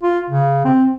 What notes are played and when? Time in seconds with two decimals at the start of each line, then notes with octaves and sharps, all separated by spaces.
0.03 F4
0.30 C#3
0.65 C4